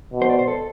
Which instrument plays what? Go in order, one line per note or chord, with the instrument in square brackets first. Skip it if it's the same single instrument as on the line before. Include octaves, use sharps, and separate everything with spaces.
[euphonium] B2
[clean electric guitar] C5
D5
C5
A4